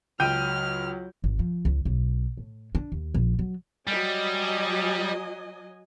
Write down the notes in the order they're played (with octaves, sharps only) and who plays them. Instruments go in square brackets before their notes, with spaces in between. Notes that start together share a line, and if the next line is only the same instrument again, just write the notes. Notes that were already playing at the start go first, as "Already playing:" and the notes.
[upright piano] C#2 G6 D#7 [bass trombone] F#3 [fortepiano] G5 [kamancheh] F6
[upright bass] G#1
F3
C#2
B1
A2
D4
D#2
A#1
F#3
[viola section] F#3 D#5 G#5 [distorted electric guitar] G3